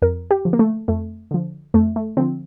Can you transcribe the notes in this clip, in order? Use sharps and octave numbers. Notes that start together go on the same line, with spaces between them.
F2 A#4
G4
D3 F3
A#3
A3
F2 A3
D3 F3
F2 A3
A3
D3 F3 C4